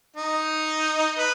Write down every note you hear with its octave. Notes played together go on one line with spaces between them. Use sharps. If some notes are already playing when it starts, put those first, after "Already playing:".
D#4
B4